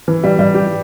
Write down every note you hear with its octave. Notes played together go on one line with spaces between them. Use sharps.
E3
G3
G3
G4